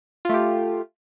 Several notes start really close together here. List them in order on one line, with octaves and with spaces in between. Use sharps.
F4 A3 G4